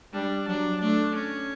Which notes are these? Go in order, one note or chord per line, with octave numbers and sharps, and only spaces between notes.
G3 D4
F#3 D4
A3 D4
C#4